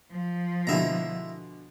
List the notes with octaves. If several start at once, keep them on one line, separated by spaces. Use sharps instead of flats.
F3
B2 D3 G#3 E4 E5 A#5